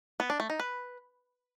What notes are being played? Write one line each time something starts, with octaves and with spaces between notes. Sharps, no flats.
B3
D4
A3
D#4
B4